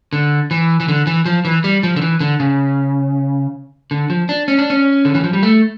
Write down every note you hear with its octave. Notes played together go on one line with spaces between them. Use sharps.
D3
E3
E3
D3
E3
F3
E3
G3
F3
D3
E3
D3
C#3
D3
F3
D4
C#4
D4
C#4
D3
E3
F3
G3
A3